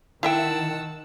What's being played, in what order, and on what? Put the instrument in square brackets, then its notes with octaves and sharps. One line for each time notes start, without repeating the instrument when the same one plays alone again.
[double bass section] D#3 [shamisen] E4 E5 G5 [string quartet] F#5 A5 E6